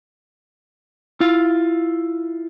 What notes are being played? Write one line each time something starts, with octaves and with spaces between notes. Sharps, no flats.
E4 F4 F5